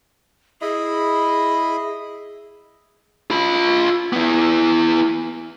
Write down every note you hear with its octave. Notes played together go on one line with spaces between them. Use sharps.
E4 G#4 D#5 B5
F4 B5
B3 E4